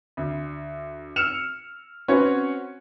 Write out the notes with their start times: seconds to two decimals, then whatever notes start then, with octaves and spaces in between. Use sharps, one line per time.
0.17 D2
1.16 E6 F6 C#7 E7 F7
2.08 C4 C#4 F#4 B4 C#5